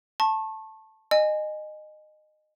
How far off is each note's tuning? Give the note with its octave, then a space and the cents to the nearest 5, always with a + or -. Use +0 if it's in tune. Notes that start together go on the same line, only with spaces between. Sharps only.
A5 +0 C#6 -35
D#5 -20 G#5 +0